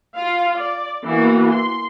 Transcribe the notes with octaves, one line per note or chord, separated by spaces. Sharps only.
F4 F5
D5
E3 A#3 B3 F#4
C6